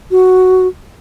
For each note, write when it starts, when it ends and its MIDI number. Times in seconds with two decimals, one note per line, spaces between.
0.11 0.67 66